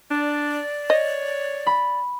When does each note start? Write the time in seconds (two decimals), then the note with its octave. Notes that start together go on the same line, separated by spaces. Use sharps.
0.10 D4 D5
0.90 C#5 D#5
1.67 B5